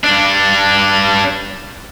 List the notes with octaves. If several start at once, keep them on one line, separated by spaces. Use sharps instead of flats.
G2 D4